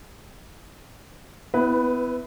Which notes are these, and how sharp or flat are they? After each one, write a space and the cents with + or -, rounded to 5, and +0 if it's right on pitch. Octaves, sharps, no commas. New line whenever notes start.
B3 +30 E4 -5 B4 +0